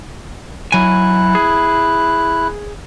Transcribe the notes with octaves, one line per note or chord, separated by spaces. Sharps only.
F#3 E4 G#5 F#6
G#4